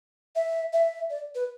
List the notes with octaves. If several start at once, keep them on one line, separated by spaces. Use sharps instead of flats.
E5
E5
D5
B4